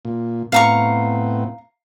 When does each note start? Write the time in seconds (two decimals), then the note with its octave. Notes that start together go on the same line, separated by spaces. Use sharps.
0.05 A#2
0.52 A2 B3 C4 F5 A#5 C#6